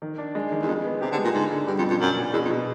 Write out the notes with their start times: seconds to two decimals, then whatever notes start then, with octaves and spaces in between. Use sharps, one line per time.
0.02 D#3
0.18 D4
0.35 G#3
0.52 D#3
0.62 E2
0.68 F2 G#3
0.84 B3
1.01 C3 G4
1.12 D3
1.18 G#3
1.24 A#2
1.34 G#2 D3
1.51 D3
1.67 G2 G3
1.78 F2
1.83 B2
1.90 F2
2.00 F#2 D4
2.17 A#2
2.33 E2 B2
2.45 F2
2.51 B2